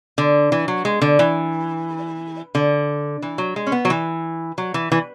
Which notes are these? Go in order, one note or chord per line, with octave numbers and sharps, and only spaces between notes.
D3
E3
F#3
G#3
D3
E3
D3
E3
F#3
G#3
C#4
B3
F#3
E3
F#3
E3
E3